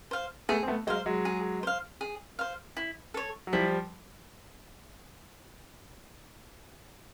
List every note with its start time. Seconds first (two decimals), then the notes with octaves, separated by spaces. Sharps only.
0.11 C5 F5
0.49 A3 B3 G#4
0.63 C4
0.68 A3 B3
0.87 F#3 G#3 C5 F5
1.06 F#3 G#3
1.25 G#4
1.63 C5 F5
2.01 G#4
2.39 C5 F5
2.77 E4
3.14 A4 C#5
3.47 F#3
3.53 F3 G3 E4